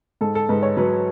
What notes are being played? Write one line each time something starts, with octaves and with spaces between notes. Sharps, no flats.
G#2 A4
A4
G#2 B4
C#5
F#3 B4